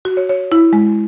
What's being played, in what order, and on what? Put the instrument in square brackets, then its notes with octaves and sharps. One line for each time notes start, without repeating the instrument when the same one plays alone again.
[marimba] F#4
C#5
C#5
E4
G#3